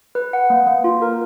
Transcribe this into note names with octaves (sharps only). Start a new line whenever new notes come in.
B4
F#5
A#3
A#3
F4
A#4